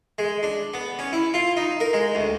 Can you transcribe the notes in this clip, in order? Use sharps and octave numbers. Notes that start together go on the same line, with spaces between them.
G#3
D4
B3
C#4
E4
F4
D#4
A#4
G#3
D2